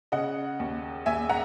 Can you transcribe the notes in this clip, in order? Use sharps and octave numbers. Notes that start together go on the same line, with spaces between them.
C#3 D#5 F#5
D#2
D#2 E5 G#5
F#5 A#5